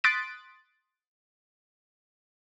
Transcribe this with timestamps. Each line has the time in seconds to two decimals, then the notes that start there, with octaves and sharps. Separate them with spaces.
0.04 C6 D#6 F#6 A6 B6 D7